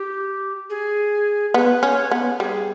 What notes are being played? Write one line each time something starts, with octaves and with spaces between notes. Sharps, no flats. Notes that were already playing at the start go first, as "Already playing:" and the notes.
Already playing: G4
G#4
B3 B4
C#4 C#5
B3
G3 G#4